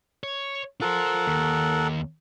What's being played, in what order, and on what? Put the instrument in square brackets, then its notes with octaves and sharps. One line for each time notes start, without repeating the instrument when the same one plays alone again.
[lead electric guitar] C#5
[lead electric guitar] F4 C5 [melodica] A4 A#4 F#5
[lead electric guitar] D#2